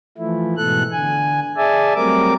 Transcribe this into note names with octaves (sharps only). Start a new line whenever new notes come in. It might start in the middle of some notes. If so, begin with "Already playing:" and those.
E3 F3 A3 E4
G#2 B2 E3 A4 F#6
D3 G#5
G#4 D5 E5 G#5 A5
F#3 G3 A3 C4 A#4 D6